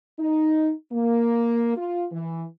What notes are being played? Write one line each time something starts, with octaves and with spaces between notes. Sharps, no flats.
D#4
A#3
F4
E3